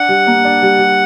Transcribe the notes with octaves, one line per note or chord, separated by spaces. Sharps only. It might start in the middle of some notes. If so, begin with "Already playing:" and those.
Already playing: D4 F#5
G3
A#3
D4
G3
G3